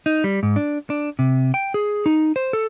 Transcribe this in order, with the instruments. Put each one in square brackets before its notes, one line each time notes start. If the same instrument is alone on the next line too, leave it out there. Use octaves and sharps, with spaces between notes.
[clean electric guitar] D#4
G3
G#2
D4
D4
C3
G5
G#4
D#4
C5
A4